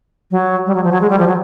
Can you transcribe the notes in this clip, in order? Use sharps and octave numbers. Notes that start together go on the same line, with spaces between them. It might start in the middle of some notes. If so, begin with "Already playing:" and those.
F#3
G3
F#3
F3
F#3
G#3
G3
F3
F#3